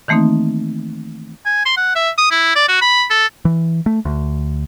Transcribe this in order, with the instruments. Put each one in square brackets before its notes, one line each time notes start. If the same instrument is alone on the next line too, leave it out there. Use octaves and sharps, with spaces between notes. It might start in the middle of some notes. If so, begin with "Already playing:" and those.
[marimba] D#3 E3 A3 A#3 C4 D#4
[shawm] G#5
C6
F#5
E5
D#6
E4
D5
F#4
B5
A4
[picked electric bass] E3
A3
D2